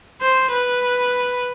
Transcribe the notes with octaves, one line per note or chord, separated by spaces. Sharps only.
C5
B4